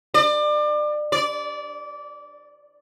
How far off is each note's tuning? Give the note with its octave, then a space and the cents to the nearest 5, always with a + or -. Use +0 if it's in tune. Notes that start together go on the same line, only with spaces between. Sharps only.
D5 +30
D5 -20